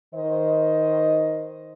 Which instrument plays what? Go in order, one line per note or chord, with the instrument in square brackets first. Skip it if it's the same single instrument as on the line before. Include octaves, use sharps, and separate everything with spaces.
[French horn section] D#3 C5 D#5